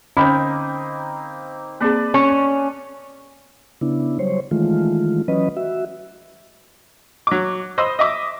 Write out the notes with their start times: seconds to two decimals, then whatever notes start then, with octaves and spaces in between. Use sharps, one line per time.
0.17 D3 A#3 C4 C#4 D#4 D#5 B5
1.81 A#3 C4 G#4 B4 D5 A5
2.14 C#4
3.81 C#3 B3 D4 E4
4.19 F#3 G3 C5 C#5
4.51 D#3 E3 G#3 A3 F4
5.28 E3 F#3 C#4 B4 D#5
5.57 F#4 E5
7.27 F#3 D6
7.78 C5 D#5 B5 C6 D#6 E6
7.99 D#5 E5 D6 D#6